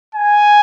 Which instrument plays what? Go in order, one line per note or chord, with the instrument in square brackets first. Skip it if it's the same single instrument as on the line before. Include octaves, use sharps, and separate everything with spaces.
[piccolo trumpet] G#5